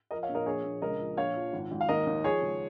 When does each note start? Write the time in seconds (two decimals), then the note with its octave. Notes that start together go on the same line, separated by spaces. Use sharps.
0.11 F3 A#4 D#5
0.23 C#5 F5
0.29 A#1
0.35 A#4 D#5
0.46 A#1 G#4 C#5
0.64 A#1
0.82 C#2 A#4 D#5
1.00 F3
1.17 A#1 C#5 F5
1.35 F3
1.53 G#1
1.71 G#1
1.81 F5
1.88 D#2 A#4 D#5
2.06 D#2
2.24 F3 G#4 C#5
2.42 C#2